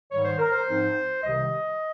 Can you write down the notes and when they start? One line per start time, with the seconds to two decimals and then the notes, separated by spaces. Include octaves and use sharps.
0.12 G#2 D#3 G3 C#5
0.25 C5
0.39 A#4
0.52 C5
0.67 G#2 F3 C4 D#4
1.22 C2 C3 D#3 D#5